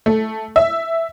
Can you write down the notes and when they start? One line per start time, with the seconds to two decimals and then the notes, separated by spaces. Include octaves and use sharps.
0.06 A3
0.56 E5